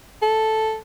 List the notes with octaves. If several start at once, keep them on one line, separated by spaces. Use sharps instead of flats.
A4